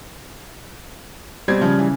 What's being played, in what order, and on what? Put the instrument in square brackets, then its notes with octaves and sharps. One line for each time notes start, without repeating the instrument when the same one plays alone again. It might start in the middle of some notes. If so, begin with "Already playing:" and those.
[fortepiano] B2 C4 [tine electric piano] G3 [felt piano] G#6
[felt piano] C#3 [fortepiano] F3
[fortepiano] E3